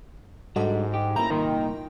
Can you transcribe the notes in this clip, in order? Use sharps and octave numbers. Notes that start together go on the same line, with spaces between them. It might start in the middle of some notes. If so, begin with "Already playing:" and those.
G#2 G3 G#3 D4 F#4 A4 D#5
G4
A3 A#3 C#4 E4 G5 A#5
C2 A#2 D#3 C6